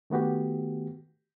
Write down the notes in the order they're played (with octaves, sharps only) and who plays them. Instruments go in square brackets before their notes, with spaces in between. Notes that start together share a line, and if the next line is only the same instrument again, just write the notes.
[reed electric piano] D#3 A3 B3 F#4 G4